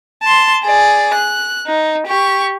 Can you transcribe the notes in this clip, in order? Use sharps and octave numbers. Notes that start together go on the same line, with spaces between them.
A5 C6
G#4 D5
F#6
D#4
G4 C#6